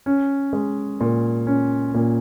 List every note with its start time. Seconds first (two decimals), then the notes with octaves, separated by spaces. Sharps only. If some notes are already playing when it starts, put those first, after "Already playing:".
0.06 C#4
0.53 G#3
1.01 A#2
1.47 C#4
1.94 A#2